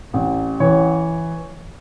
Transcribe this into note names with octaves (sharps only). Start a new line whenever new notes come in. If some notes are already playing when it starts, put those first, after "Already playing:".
A1
E3 C#5